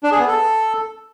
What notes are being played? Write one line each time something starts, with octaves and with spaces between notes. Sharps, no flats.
D4
G#4
B3
A4